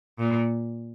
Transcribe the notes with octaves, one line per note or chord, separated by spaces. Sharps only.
A#2